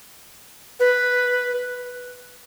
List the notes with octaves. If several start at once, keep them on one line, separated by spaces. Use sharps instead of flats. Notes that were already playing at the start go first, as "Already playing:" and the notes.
B4